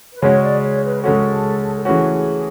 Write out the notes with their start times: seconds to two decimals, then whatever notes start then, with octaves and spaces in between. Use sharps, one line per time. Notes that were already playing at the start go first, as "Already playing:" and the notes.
0.13 B4
0.22 C#3 G#3 C#4 F#4 C#5
0.43 D5
0.63 C#5
0.84 B4
1.03 C#3 G#3 C#4 F#4 A4
1.76 A4
1.85 E3 A3 C#4 F#4 G#4